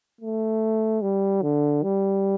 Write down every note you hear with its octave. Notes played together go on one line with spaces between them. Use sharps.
A3
G3
D3
G3